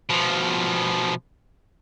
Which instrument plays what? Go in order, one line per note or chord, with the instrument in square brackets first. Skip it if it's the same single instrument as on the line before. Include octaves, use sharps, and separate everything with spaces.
[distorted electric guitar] B2 F3